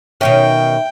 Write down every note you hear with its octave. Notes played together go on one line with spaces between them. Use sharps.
B2 D#3 C#4 E5 G5